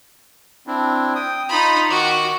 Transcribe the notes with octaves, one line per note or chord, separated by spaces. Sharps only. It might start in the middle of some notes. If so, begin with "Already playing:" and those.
C4 D4 E4
G5 D#6
D#4 F4 B5
D#3 F#4 D6